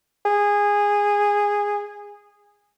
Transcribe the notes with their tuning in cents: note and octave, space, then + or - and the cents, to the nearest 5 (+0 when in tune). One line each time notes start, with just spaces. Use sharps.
G#4 -15